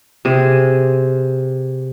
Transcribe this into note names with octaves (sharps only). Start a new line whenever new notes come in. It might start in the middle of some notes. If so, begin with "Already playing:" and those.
C3 G#4